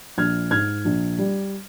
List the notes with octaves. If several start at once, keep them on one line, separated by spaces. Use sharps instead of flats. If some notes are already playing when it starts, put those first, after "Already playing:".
A#1 F6 G#6
G#2 F6 G#6
A#1
G3